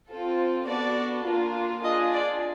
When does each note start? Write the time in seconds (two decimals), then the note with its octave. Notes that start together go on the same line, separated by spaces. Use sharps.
0.09 C4 F4 A4
0.67 B3 D4 F#4 A4 D5
1.25 A#3 D4 F4
1.83 D4 F4 G#4 D#5
2.12 D5